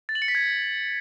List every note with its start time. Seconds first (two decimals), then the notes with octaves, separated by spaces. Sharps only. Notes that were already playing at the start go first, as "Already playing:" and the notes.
0.09 A6
0.15 F#7
0.22 C#7
0.28 B6
0.35 G#6